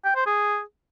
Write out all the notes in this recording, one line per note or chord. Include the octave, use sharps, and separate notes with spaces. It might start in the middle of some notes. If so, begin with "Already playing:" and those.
G5
C5
G#4